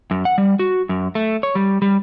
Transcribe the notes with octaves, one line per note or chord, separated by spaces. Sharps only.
F#2
F#5
G3
F#4
F#2
A3
C#5
G3
G3